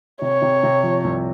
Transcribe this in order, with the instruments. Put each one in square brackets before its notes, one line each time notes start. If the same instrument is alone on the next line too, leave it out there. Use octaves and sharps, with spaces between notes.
[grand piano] C3 [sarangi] C#5
[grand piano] C3
C3
F3
C2